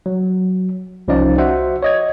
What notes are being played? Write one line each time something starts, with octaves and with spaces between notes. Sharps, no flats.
F#3
C2 F3 C#4 D#4 D5 F5
F#4 C5 E5 F#5
C#5 D#5 G#6